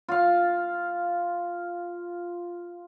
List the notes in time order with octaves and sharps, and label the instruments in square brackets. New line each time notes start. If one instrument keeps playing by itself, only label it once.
[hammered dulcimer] F4 F5